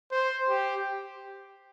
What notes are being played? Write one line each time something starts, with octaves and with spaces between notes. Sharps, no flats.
C5
G4